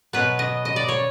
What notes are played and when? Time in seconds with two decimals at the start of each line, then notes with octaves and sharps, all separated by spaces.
0.13 B2 F#3 B3 B4
0.39 D#5
0.65 D#5
0.76 D5
0.88 C#5